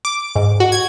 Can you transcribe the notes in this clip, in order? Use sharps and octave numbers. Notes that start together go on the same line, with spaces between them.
D6
G#2
F#4
G#6